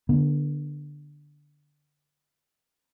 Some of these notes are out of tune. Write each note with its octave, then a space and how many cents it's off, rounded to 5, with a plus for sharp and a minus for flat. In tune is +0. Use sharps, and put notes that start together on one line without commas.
D3 +0 B3 -40